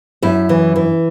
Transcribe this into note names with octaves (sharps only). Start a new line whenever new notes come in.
F#2 E4
E3
E3